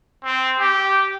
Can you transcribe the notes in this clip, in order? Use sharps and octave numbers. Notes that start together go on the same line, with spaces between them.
C4
G4